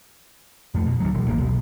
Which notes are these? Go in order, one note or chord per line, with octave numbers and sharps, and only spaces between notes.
F2 A3
B2
D2 B2 F#3
E1
G#1 A#3
B1